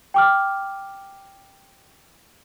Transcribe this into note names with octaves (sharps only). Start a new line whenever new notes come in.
G5 D6 F6